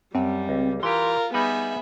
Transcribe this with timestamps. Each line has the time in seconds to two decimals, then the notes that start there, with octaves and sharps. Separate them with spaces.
0.15 F#2 G3 C4
0.49 C#2
0.83 E3 F4 G4 A#4 C6
1.34 G3 B3 D#4 G#4 B4 E5 B5